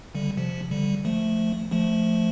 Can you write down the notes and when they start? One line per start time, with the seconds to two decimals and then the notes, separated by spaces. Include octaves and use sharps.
0.15 D3 G3
0.37 C3 F3
0.71 D3 G3
1.05 F3 A3
1.71 F3 A3